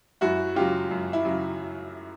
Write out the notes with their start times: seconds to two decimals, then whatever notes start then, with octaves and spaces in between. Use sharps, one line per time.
0.21 F#2 E4 F#4
0.55 C#3 F#3 F4 G4
0.91 F#2
1.13 E4
1.25 C#3 F#3